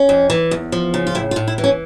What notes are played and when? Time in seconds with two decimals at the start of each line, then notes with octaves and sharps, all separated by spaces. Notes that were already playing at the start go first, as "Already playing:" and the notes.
Already playing: C#4
0.09 F2
0.30 E3
0.51 E2
0.72 F3
0.94 C#3
1.07 F4
1.15 A2 E4
1.31 F4
1.36 A2
1.48 E4
1.58 E3
1.64 C#4